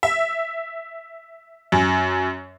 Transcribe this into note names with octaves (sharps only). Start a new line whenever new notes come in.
E5
F#2